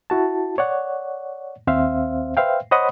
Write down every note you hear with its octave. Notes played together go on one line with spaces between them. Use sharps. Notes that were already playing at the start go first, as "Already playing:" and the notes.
E4 F#4 A5
C#5 D5 F#5
D#2 C4 C5 E5 F5
B4 C5 E5 F5 G5
C5 C#5 D#5 F#5 B5 D#6